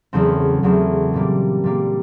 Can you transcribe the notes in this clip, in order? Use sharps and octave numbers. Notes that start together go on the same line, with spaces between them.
E2 C#3 F#3 A3 C4
E2 C#3 F#3 A3 C4
A#2 G3 A#3
A#2 G3 A#3